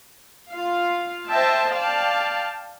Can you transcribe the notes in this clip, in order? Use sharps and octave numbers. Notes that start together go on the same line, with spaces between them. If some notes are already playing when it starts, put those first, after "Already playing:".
F4 F5
C5 D#5 E5 G5 A5
D5 F5 G5 A5